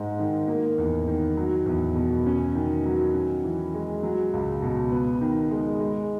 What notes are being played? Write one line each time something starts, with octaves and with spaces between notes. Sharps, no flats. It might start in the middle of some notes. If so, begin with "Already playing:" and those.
Already playing: G#2 G#3
D#3
A#3
E2
D#3
F#3
E2
B2
C#4
D#3
F#3
C#4
E3
G#3
F#3
C#2
B2
B3
D#3
G#3
G#3